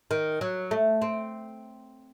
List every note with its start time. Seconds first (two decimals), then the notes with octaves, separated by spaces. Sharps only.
0.11 D#3
0.41 F#3
0.71 A3
1.02 C4